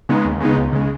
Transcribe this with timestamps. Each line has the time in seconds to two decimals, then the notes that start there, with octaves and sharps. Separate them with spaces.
0.09 C#3 G#3 B3 D#4
0.25 D#2
0.40 C#3 G#3 B3 D#4
0.57 C#2
0.73 C#3 G#3